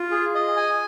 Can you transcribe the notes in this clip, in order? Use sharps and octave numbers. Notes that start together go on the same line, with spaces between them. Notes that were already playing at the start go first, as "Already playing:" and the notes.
Already playing: F4
G#4
D#5
G#5